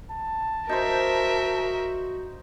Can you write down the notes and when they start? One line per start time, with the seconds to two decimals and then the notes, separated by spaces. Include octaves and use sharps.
0.11 A5
0.69 D#4 F#4 A#4 C5 E5